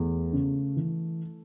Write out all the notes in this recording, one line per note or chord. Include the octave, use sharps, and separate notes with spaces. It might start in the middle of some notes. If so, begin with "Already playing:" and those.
Already playing: E2 A3
C#3
E3